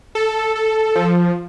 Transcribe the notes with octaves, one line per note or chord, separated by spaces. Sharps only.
A4
A4
F3